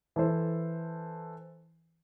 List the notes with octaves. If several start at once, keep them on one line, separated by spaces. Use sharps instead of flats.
E3 A4 C5